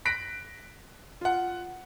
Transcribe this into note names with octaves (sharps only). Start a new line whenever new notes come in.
F#6 A#6 B6 D7
F4 F#5